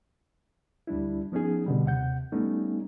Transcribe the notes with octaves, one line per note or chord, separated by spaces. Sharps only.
D2 G3 D4 E4
F3 B3 C#4 D#4 G#4
B2 D3 G3
D#2 C3 F#5 G6
G3 A3 B3 C#4 D#4